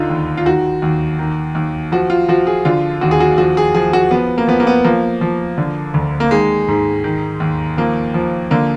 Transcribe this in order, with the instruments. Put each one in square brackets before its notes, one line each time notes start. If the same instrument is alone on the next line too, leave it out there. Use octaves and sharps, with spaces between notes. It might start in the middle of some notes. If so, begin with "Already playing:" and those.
Already playing: [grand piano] D2 D3 D#4 F4
D#2
F4
D#3 F#4
D#2
D#3
D#2
F3 F#4
F4
F3 F#4
G#4
D3 F4
D#2 F#4
G#4
F#4
F3 F#4
G#4
F3 G#4
F#4
F3 B3
A#3
F3 B3
A#3
B3
F3 A#3
F3
D3
D2
A#3
D#3 G#3
G#2
D#3
D#2
F3 A#3
F3
D3 A#3